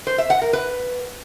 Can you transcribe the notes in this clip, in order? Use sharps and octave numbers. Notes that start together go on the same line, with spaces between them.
C5
E5
F#5
A#4
B4